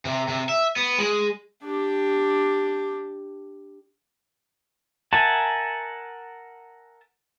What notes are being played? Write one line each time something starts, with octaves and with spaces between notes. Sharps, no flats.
C3
C3
E5
B3
G#3
D4 G4
A#4 E5 F#5 G#5 A5